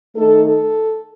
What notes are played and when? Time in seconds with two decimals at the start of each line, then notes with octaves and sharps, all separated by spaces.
0.16 D#3 A3 D#4 A4
0.46 A4